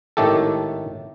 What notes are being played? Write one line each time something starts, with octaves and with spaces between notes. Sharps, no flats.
G#1 A2 D#3 A3 G4 A4